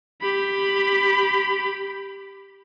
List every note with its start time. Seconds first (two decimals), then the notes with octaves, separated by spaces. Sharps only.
0.22 G4 B5